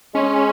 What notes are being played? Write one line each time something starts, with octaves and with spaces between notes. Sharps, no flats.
G#3 C#4